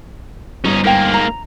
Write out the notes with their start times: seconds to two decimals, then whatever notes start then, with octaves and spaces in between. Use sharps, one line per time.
0.65 G1 C#4 D#4
0.84 G#2 A#3 A#4 G5
1.14 A#5